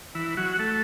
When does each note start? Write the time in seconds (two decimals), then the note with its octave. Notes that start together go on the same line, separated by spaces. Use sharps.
0.15 E3 E4
0.37 F#3 F#4
0.59 A3 A4